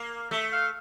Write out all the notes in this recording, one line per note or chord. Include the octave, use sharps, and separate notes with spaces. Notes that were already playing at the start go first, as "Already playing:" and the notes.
Already playing: A#3
A3 E5
F5